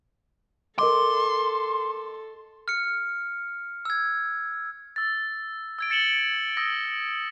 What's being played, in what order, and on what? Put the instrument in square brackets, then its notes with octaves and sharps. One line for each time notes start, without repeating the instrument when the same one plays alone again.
[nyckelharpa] A4 [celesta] A#4 D#5 D6 [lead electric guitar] C6
[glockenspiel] F6 C#7
E6 G#6
[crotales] E6 A6
E6 G#6 D7
A6 C#7 E7 F#7 G7
D#6 E6 A#6